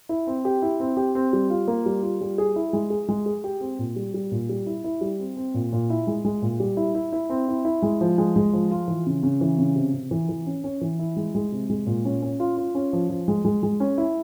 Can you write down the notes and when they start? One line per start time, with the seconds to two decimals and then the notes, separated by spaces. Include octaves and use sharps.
0.09 E4
0.27 C4
0.45 G4
0.62 E4
0.80 C4
0.97 G4
1.15 C4
1.33 G3
1.50 F4
1.68 A#3
1.86 G3
2.03 F4
2.21 G3
2.38 G#4
2.56 E4
2.73 G#3
2.90 G#4
3.09 G#3
3.26 G#4
3.44 G4
3.61 C4
3.79 A#2
3.96 G3
4.14 G3
4.31 A#2
4.49 G3
4.66 E4
4.84 E4
5.01 G3
5.20 C4
5.37 C4
5.54 A#2
5.72 A#2
5.90 E4
6.07 G#3
6.25 G#3
6.42 A#2
6.60 G3
6.77 E4
6.95 E4
7.12 E4
7.30 C4
7.48 E4
7.65 E4
7.82 G#3
8.01 F3
8.18 G#3
8.36 G#3
8.53 F3
8.71 F4
8.88 E3
9.06 C#3
9.23 C#3
9.41 E3
9.58 C#3
9.76 C3
9.93 C3
10.11 E3
10.29 E3
10.46 C#4
10.64 C#4
10.81 E3
10.99 E4
11.17 G#3
11.35 G#3
11.52 C3
11.70 G#3
11.86 A#2
12.05 C#4
12.22 C#4
12.40 F4
12.57 F4
12.75 C#4
12.93 F3
13.09 F3
13.28 G#3
13.45 G#3
13.63 G#3
13.80 C#4
13.98 E4